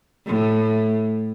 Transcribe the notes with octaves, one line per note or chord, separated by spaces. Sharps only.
A2